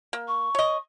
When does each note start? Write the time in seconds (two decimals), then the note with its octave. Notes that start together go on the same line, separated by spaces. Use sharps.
0.13 A#3
0.28 C#6
0.55 C#5 D#5